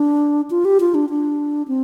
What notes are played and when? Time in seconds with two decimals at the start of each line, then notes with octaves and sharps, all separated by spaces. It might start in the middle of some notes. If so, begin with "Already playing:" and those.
Already playing: D4
0.50 F4
0.65 G4
0.80 F4
0.94 D4
1.10 D4
1.68 C4